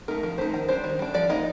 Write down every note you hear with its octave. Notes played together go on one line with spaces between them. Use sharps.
A3 D#4 A#4
F3 A#4
A3 D#4 C5
D#3 A#4
G3 D4 C5
D#3
G3 D4
F3 D5
A#3 D#4 D#5